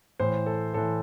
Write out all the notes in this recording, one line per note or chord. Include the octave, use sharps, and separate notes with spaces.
A2 E3 C5
A4
A2 E3 A4